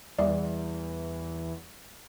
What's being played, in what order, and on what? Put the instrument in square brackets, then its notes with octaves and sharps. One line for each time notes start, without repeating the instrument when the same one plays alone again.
[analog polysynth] E2 [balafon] G3 E5 [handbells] D5